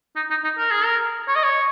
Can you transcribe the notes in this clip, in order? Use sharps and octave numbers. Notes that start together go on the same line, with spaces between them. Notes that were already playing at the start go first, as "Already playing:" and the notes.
D#4
D#4
D#4
A#4
G#4
A#4
C#5
D#5
C#5